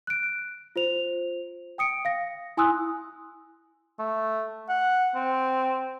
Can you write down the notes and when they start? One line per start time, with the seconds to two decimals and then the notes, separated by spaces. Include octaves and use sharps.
0.07 F#6 D7
0.76 F4 C5 F7
1.78 G5 D#6 C#7 D7
2.05 F5 A#6
2.57 E4 G#5 C6 D#6 E6 F#6
3.99 A3
4.69 F#5
5.15 C4